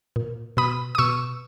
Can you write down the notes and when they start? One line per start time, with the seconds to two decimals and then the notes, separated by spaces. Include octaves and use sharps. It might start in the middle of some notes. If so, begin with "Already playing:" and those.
0.16 A#2
0.57 B2 B5 D#6
0.95 D#6
0.98 B2 C#6 E6